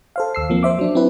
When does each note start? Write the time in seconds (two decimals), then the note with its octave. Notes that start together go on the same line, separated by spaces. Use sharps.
0.16 A4 C5 F5
0.35 D#2 E6 C7
0.50 F3 A#3 C4
0.63 C5 E5 D6
0.79 F#3 D4
0.95 C4 D4 E4 B4